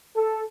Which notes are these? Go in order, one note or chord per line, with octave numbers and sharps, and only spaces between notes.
A4